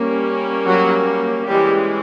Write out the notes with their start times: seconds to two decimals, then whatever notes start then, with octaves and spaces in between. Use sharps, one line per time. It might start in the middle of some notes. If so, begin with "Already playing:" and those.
Already playing: G3 A#3 C#4
0.66 F#3 F#4
1.45 E3 G3 G#3 C#4 G4